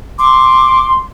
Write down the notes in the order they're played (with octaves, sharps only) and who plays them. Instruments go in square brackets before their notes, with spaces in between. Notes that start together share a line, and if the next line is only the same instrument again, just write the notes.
[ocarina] C6 [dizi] D6